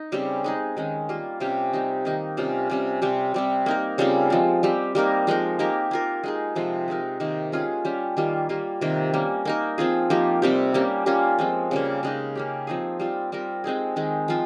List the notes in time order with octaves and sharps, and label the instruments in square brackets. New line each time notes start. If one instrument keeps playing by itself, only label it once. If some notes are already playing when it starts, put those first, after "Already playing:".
Already playing: [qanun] D#4
C#3 G3 C4 G4
G#3 D#4 G#4
D#3 G#3 C#4
G3 A#3 F4
C3 G3 C#4 G4
G3 C4 D#4
D#3 A#3 D#4
C3 G3 C#4 F4
C3 G3 C#4
C3 G3 C4
C3 G3 C4
A#3 D#4 A#4
C#3 G3 C4 F4
F3 G#3 C4
G3 C4 G4
G3 A#3 D#4 A#4
F3 G#3 D#4 A#4
A#3 D#4 G4 A#4
A#3 F4 A#4
G#3 D#4 G#4
C3 F3 G#3 C4
G#3 C4 D#4 A#4
C3 D#3 A#3 D#4
G#3 C#4 F4 G#4
G3 C#4 G4
D#3 G3 A#3 F4
G3 A#3 F4
C3 D#3 A#3
G3 A#3 C#4
A#3 D#4 A#4
F3 C4 F4 G#4
F3 A#3 D#4 G4
C3 G3 C4 G4
G3 A#3 C#4 G4
G3 A#3 C#4 F4
F3 G#3 C4
C#3 G3 A#3
C#3 G#3 D#4
A#3 C#4 G4
F3 C4 D#4 G#4
G3 C4 F4
G3 C4 F4 A#4
G#3 C4 D#4 G#4
D#3 G#3 C4 D#4
F3 C4 F4